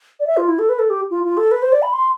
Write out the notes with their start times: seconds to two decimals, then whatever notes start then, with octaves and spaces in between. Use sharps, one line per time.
0.20 D5
0.27 E5
0.37 F4
0.48 E4
0.59 A4
0.69 B4
0.79 A4
0.90 G4
1.11 F4
1.24 F4
1.37 A4
1.51 B4
1.62 C5
1.72 D5
1.82 B5
1.93 C6